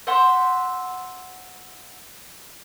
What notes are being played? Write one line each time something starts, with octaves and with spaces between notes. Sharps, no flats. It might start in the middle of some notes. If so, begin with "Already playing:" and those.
C5 E5 F#5 C6